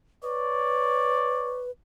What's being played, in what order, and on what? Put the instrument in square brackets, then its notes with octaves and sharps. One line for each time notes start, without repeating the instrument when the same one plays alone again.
[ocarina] B4 [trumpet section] C#5 D5